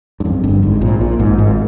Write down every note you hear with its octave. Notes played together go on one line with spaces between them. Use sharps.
G2
F2
G1 G2
G#1 G#2
A#1 A#2
A#1 A#2
G#1 G#2
G#1 G#2